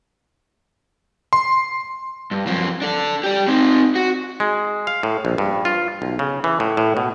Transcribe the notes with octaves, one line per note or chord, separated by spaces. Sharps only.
C6
G2
F#2 F3
D4 A4
G4 D5
C4 D#4
F#4
G#3
F5
A2
A#1
G2
F4
B1
C#3
E3
A2
A2
B2